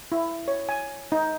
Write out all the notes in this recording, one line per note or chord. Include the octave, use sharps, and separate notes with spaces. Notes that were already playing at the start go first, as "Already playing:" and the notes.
E4
C#5
G#5
D#4